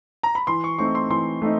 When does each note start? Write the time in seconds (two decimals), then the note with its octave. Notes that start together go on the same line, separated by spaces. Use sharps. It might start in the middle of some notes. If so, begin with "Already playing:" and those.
0.23 A#5
0.35 B5
0.47 E3 C6
0.64 C#6
0.78 A3 C4 D#4 C#6
0.95 C6
1.10 E3 C6
1.42 A3 C4 D#4